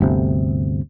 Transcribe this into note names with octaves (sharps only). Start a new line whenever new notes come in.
G1 D2 C3